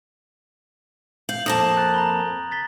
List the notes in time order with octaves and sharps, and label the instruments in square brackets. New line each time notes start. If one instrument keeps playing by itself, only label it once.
[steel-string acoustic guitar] F5 [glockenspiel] G6 F#7
[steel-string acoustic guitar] F2 A#3 A5 [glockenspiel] D#6 A#6
[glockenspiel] A#5 F#6 A6
A#5 B5 G7
G#5
A6 B6 G7